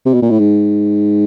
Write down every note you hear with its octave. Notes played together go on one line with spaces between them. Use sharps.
C3
B2
A#2
A2
G#2